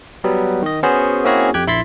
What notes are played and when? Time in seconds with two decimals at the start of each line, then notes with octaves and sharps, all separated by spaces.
0.24 F#3 G3 B3
0.62 D#3 D#5
0.83 B3 C#4 F#4 G#4 C5
1.24 A#3 C4 C#4 E4 F#4 G#4
1.54 F2 G4 G5 F#6 G#6
1.67 A#1 E4 B5 C6 A6 B6